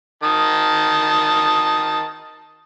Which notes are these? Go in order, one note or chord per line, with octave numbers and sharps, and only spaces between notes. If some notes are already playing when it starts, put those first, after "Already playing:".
D#3 A5 D#6